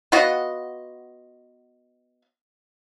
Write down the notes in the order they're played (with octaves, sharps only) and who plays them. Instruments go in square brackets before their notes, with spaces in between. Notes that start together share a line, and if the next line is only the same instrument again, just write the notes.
[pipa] B3 F4 F#4 D#5